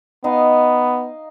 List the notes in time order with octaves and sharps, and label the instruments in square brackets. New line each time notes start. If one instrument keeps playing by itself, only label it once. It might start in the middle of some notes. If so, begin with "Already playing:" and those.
[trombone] B3 [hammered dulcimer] D#4 D#5 F5